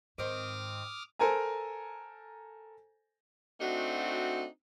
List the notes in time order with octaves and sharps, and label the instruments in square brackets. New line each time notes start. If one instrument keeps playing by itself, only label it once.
[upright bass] G#2 [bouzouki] D#3 C4 [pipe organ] D6 D#6 F6
[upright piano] A4 A#4 C5 G#5 A#5
[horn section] A3 C4 D4 D#4 F#4